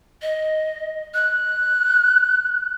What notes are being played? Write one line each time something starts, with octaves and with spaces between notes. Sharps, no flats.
D#5
F#6